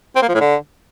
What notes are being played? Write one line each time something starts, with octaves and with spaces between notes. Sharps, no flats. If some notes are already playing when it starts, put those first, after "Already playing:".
C4
A#3
F3
A2
D3